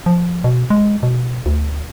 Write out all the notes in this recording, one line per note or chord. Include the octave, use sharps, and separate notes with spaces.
F3
B2
G#3
B2
D2